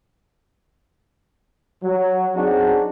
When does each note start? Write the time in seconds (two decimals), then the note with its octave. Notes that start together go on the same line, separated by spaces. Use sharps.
1.84 F#3
2.35 F#3 C4 D4 D#4 F#4 G#4